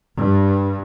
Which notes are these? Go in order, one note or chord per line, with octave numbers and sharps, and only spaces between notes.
G2